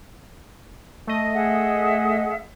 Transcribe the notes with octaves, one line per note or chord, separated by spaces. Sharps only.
A3 D#5
G#4 E5 F#5